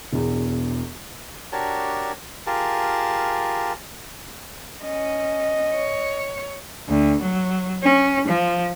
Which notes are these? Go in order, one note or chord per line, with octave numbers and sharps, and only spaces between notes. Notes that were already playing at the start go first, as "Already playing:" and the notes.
E1 E2
D4 F#4 G4 A#4 C#5 A5
F4 G4 G#4 A#4 A5
C#4 D#5
C#5
D2
F#3
C#4
F3